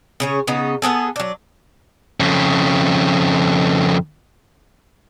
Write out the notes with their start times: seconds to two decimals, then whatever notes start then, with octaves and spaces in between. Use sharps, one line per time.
0.20 C#3 C#4 C#5
0.47 C#3 B3 D#4
0.82 B3 C4 G#4 A4
1.16 F#3 D4
2.20 F2 C#3